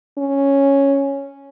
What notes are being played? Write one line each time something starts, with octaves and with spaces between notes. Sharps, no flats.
C#4